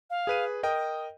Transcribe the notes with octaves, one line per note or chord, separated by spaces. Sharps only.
F5
G#4 B4 D#7
A#4 D#5 G5 D#6